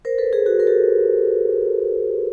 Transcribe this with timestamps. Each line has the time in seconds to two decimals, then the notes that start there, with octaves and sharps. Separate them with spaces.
0.05 A#4 C5
0.18 A4 B4
0.32 G#4 A#4
0.46 F#4 G#4
0.60 A#4
0.67 G4 A4